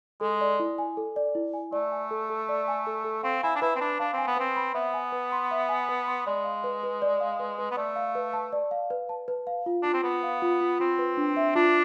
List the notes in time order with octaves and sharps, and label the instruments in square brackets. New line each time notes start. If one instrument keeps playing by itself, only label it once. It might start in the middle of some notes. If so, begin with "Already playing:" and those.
[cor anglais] G#3 [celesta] A4
[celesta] D5
E4
G#5
A4
D5
E4
G#5
[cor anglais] A3 [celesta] D5
[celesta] G#5
A4
A4
D5
G#5
A4
A4
[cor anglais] C4 [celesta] F5
[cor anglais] E4 [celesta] G#5
[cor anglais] D4
[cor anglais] E4 [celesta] B4
[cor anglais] C4
[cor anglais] D4 [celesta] B5
[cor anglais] D4 [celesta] F5
[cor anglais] C4
[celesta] G#5
[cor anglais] B3
[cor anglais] C4 [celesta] B4
[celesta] B5
[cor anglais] B3 [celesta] E5
[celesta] G#5
B4
C6
E5
G#5
B4
C6
[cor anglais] G#3 [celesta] D5
[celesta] F5
B4
B4
D5
F5
B4
B4
[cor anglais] B3
[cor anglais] A3 [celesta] D5
[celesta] F5
B4
A5
D5
F5
B4
A5
B4
F5
F4
[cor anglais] D4 [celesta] F4
[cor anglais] C4
[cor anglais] B3 [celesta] B4
[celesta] F5
F4
F4
[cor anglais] C4 [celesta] F4
[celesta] B4
D4
E5
[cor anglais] D4 [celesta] F4